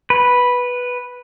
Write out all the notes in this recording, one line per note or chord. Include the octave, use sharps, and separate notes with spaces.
B4